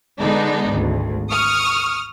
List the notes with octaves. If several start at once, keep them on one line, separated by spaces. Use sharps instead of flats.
D3 G#3 B3 D4 D#4
G#1 D2
C#6 D#6 F6